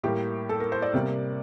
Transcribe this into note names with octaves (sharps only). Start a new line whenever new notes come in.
A2 G3 A#3 G4
A4
A#4
C5
D5
C3 G3 A#3